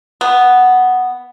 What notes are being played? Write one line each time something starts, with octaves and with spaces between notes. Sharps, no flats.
B3